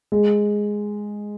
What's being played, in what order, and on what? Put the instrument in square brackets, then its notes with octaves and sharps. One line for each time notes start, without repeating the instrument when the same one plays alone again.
[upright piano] G#3